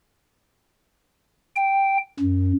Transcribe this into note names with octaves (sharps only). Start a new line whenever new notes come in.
G5
F#2